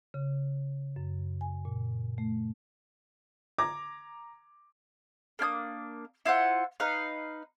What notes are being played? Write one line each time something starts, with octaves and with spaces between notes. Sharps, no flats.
C#3
F#2
G#5
A#2
A3
A#5 D6 G#6 A#6
A#3 D4 G#5 D#6
E4 F4 C5 F#5
D#4 B4 F5